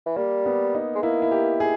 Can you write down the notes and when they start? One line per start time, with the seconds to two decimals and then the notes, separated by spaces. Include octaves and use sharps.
0.06 E3
0.16 G3 A#3
0.46 B3
0.74 D#4
0.95 G#3
1.03 A#3 E4
1.22 E4
1.31 G4
1.60 G#4